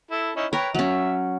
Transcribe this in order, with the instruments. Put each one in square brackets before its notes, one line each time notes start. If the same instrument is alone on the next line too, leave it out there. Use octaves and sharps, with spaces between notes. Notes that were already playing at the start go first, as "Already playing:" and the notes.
[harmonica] E4 A4
C#4 D#4 E4
[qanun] A#4 [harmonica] B4 C#5 G5
[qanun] F#3 C#4 [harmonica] E5